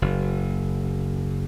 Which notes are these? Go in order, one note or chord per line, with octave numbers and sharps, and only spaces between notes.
F#1